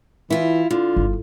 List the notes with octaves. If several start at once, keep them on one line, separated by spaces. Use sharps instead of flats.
E3 E4 F4
D3 F4
G1